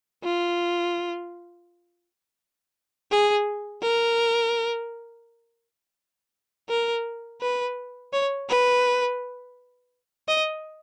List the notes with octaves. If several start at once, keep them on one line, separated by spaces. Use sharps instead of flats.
F4
G#4
A#4
A#4
B4
C#5
B4
D#5